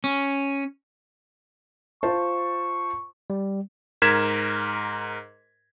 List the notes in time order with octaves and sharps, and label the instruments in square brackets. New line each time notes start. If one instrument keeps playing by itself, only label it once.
[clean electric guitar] C#4
[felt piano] F4 C5 A5 [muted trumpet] C#6
[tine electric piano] G3
[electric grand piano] G#2 A#4 G#6 B6 E7